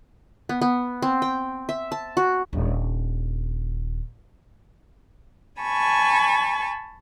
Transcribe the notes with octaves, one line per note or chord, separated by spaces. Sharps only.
B3
B3
C4
G5
E5
A5
F#4
D#1 D4
G#5 A5 B5 C#6